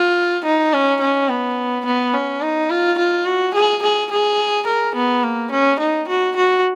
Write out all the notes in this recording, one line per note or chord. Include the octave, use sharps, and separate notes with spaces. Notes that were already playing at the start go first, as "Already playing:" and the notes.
Already playing: F4
D#4
C#4
C#4
B3
B3
C#4
D#4
F4
F4
F#4
G#4
G#4
G#4
A#4
B3
A#3
C#4
D#4
F#4
F#4